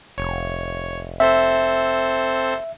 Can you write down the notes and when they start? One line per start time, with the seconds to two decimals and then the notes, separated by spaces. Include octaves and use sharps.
0.18 F1 C#5
1.20 C4 A4 C5 E5